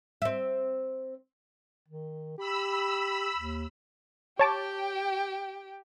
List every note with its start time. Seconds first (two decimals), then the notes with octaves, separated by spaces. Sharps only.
0.22 C4 E5
1.88 D#3
2.38 G4 B5 E6
3.36 D#2
4.39 G4 C#5 G5 A5 D6